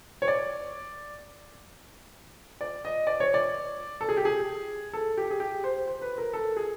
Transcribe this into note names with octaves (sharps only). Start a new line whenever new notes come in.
C#5
D5
D5
D#5
D5
C#5
D5
A4
G#4
G4
G#4
A4
G4
G#4
G4
C5
C5
B4
A#4
A4
G#4